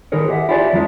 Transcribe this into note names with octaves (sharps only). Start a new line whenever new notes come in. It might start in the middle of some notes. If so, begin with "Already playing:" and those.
D#3 E4 G#4 A#4 C#5
G4 G#4 C#5 D#5 E5 F#5
E4 F4 G4 G#4 C#5 D5
F2 F3 F#3 G#3 C#4 E5